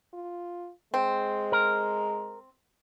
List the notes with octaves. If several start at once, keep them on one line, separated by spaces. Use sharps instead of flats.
F4
G#3 C4
A#4